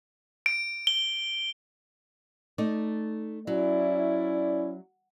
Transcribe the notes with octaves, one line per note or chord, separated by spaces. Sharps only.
D7
G7
A3 D#4 D5
F#3 C#4 E4 D5